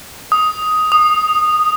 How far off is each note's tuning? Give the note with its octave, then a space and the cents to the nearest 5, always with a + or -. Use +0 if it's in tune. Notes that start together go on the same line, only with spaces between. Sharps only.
D#6 +5
D#6 -15